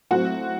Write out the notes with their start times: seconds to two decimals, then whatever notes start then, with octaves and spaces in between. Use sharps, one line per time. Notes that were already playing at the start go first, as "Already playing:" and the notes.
0.11 A2 F#3 C4 F#4 F#5